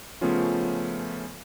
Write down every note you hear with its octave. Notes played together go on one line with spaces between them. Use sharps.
C#3 F3 A3 B3 C#4 F4